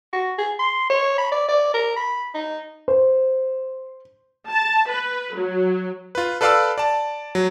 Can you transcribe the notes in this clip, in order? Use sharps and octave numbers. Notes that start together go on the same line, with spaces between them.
F#4
G#4
C6
C#5
B5
D5
D5
A#4
B5
D#4
C5
A5
B4
F#3
F4 B4
A4 B4 D5 F5 B5 E6
D5 A5
F#3